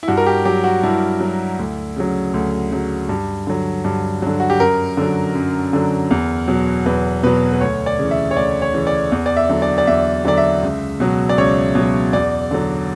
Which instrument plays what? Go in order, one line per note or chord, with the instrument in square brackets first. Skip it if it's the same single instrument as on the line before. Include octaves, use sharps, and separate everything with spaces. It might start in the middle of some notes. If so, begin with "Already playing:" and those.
[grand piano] E4
G2 F#4
A#4
G4
F#3 G4
F#4
G2 E4
F#3
D2
C#3 F#3
D2
C#3 F#3
G2
D3 F#3
G2
D3 F#3
F#4
G4
F#2 A#4
D3 F#3
F#2
D3 F#3
E2
B2 F#3
E2 B4
B2 F#3 B4
B4
D2 C#5
D5
C#3 E3
E5
C#5
D2 D5
C#5
C#3 E3
D5
E2
D5
E5
D3 F#3
D5
D5
E2 E5
D3 F#3 D5
E5
C#2
B2 F#3
D5
C#2 C#5
B2 F#3
E2 D5
D3 F#3